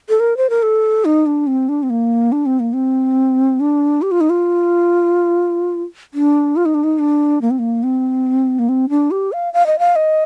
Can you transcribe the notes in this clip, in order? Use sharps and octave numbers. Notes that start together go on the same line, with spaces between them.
A4
A#4
C5
A#4
A4
D#4
D4
C4
D4
C4
A#3
D4
C4
A#3
C4
D4
G4
F4
D#4
F4
D4
F4
D#4
D4
D#4
D4
A#3
C4
A#3
C4
A#3
C4
D4
G4
F5
F5
D#5
F5
D#5